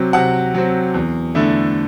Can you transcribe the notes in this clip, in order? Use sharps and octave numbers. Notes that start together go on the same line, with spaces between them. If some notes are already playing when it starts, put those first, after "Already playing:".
Already playing: C3 F#3 C4
C3 F#5
F#3 C4
E2
D3 A3 E4